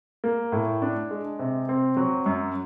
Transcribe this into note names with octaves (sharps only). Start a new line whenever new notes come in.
A#3
A2
D4
G#3
C3
C4
F#3
F#2